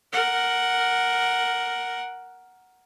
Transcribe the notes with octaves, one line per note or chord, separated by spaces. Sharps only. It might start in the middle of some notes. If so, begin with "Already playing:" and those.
A#4 F#5